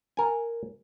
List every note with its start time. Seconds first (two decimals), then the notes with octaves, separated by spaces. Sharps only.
0.17 A#4 G#5